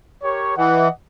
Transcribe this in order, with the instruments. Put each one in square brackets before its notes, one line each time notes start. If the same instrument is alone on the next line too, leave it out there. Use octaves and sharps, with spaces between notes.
[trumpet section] G4 A#4 C#5
[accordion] E3 [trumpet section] D#5 F#5